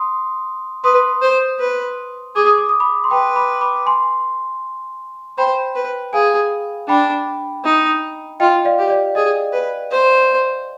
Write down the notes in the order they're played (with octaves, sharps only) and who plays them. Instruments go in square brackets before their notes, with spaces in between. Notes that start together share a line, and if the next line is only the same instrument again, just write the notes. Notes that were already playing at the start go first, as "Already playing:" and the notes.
Already playing: [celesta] C6 D#6
[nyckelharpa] B4 [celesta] C6 D#6
[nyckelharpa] C5
B4
[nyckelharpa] G#4 [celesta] D6
[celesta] D#6
D6
D#6
B5 D6
C6
[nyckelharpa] B4 [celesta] G5 B5
[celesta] B5 D6
B5 D6
G#5 C6
[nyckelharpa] C5 [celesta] G5 B5
[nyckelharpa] B4
[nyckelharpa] G#4 [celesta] F5 G#5
[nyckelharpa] D4 [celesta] G5 B5
[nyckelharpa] D#4
[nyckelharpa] F4 [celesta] D#5 G5
[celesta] D5 F5
[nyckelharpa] G4
[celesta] D5
[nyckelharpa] G#4 [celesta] D#5
[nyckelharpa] B4
C5